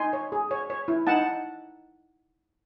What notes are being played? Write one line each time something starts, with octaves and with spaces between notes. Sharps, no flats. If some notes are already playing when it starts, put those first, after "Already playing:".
Already playing: D#4 G#5 C6
C#5
G#4
C#5
C#5
E4
D#4 F#5 A5